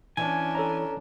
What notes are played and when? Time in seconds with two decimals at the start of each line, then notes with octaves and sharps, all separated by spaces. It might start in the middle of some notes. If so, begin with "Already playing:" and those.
0.17 E3 C#4 D4 G#5
0.55 A4 C#5 A#5